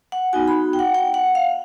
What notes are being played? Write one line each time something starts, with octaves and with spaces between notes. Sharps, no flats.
F#5
B3 D#4 F#4 G#5
B5
G5
F#5
G5
F#5
F5